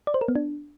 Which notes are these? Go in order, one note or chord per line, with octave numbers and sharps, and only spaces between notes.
D5
C5
A#4
B3
D4